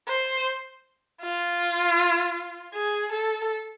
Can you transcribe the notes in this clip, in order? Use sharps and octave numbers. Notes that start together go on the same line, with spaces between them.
C5
F4
G#4
A4